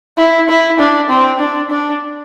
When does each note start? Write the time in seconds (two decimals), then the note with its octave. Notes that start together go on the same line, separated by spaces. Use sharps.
0.18 E4
0.49 E4
0.79 D4
1.09 C4
1.40 D4
1.70 D4